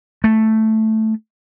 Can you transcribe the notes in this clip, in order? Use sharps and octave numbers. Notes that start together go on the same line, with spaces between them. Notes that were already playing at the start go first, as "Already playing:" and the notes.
A3